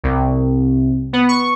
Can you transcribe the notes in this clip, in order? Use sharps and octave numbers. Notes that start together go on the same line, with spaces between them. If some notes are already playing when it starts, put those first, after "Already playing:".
C2
B3
C#6